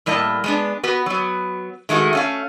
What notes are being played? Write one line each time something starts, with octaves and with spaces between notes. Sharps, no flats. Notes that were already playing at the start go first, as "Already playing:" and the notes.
A2 G3 A#3 D#5 A5
G#3 B3 D4
B3 F#4 B4
F#3 B3
D#3 G#3 A3 E4 F#4
A3 C#4 F5